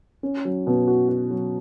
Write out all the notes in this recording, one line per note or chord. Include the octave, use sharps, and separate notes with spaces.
C#4
F#3
B2
F#4
F#4
F#3